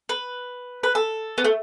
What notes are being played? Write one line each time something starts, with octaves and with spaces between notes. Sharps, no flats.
B4
B4
A4
B3
A3